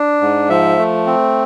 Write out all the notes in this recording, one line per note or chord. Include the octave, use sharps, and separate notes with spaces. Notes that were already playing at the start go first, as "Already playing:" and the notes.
Already playing: D4
G#2
F3 E5
A3
C4